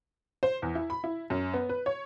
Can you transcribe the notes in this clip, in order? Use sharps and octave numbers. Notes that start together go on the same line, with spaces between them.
C5
E2
E4
B5
E4
F#2
B3
B4
C#5